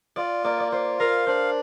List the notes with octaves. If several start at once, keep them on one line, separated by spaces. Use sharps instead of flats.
F4 D5
A#3 D5
D5
F4 C5
A#4 F5
D4 C5